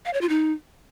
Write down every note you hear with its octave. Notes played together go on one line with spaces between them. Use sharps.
F5
C#5
F4
D#4